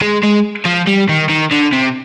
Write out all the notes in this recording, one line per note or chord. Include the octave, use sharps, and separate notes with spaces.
G#3
G#3
F3
G3
D#3
D#3
D3
C3